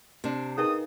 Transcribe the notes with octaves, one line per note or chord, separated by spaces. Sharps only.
C3 D4
D#4 G#4 A#4 B4 D#6